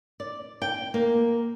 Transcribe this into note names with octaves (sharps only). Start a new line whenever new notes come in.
D5
G5
A#3